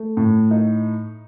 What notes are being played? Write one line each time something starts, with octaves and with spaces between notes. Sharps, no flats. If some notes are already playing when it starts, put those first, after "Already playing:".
Already playing: A3
A2
D#4